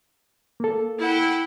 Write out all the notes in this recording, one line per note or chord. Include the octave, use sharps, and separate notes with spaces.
A#3 A4
E4 F#5 G5